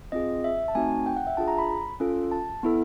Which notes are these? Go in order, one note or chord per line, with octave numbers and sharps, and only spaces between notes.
C4 F4 G#4 D#5
E5
A5
A3 C4 D#4 F#4 G#5
G5
F#5
E5
D4 F4 G#4 A5
A#5
B5
C#4 F4 A4
A5
B3 E4 A4